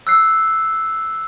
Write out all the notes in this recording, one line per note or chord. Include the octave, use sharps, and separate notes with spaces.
E6 F#6 C7